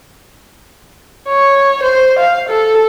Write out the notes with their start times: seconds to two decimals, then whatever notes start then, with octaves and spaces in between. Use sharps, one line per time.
1.29 C#5
1.83 C5
2.19 F5
2.49 A4